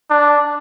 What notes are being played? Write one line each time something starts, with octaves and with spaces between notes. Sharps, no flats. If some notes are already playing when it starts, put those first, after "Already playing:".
D4